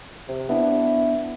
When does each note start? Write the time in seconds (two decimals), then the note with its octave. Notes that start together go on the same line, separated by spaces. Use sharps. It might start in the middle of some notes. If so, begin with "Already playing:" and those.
0.28 C3
0.49 B3 D4 E4